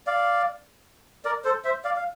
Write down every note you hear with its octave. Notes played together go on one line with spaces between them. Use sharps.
D5 F5
A#4 D5
A4 C5
C5 E5
D5 F5
F5